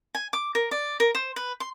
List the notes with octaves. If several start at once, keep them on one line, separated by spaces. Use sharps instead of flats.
G#5
D6
A#4
D5
A#4
C5
B4
C6